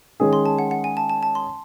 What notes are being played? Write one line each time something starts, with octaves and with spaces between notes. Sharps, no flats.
D#3 G#3 C#4 G#4
C6
A5
F#5
F#5
G#5
A5
A5
A5
C6